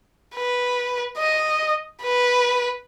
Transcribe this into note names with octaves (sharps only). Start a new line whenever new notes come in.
B4
D#5
B4